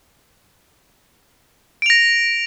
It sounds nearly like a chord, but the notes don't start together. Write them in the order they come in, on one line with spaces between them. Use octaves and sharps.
D7 F7 A#6